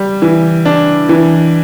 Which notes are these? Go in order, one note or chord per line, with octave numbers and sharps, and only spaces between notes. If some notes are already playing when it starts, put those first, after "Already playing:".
Already playing: G3
E3
D4
E3